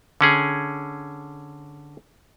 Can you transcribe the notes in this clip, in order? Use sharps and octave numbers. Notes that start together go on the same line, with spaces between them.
D3 C#4 G#4